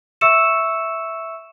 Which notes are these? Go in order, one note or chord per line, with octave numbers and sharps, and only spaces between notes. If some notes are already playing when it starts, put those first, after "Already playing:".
E5 C#6 E6 C#7 E7